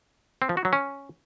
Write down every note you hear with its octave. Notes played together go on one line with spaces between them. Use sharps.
C4
F3
F#4
F#3
C#4